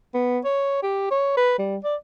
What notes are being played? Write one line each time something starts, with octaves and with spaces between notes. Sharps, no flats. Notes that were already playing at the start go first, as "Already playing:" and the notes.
B3
C#5
G4
C#5
B4
G3
D5